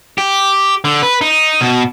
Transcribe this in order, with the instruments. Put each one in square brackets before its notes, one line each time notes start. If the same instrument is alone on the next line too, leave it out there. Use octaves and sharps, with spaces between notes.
[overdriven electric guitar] G4
D3
B4
D#4
B2